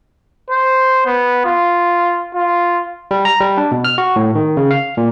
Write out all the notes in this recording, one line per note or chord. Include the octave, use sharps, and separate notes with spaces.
C5
B3
F4
F4
G3
A#5
G3
D4
B2
F6
F#4
A2
D#3
C#3
F5
A#2